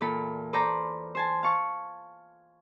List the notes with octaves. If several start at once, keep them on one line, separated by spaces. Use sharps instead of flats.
E2 A#2 F4 A4 B5
A4 B4 C5 D5 G5 A#5
C5 G#5 A5
F5 A5 C#6